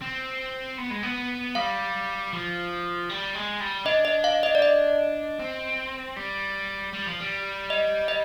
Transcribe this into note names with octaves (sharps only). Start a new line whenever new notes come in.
C4
B3
G#3
B3
G3 F5
F3
G3
G#3
G3
D4 D#5
D#5
F5
D#5
D5
D#5
C4
G3
G3
F3
G3
D#5
D#5